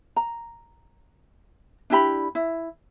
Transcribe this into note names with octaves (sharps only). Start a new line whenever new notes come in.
A#5
D4 E4 G4 B5
E4